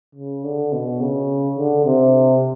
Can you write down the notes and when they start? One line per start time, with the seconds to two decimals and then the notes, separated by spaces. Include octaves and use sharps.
0.15 C#3
0.44 D3
0.73 B2
1.00 C#3
1.58 D3
1.85 C3